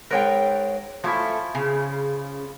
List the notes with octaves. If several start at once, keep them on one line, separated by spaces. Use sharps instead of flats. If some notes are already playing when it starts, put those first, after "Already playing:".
G#2 A#4 B4 C#5 G5
F3 A3 C#4 E4
C#3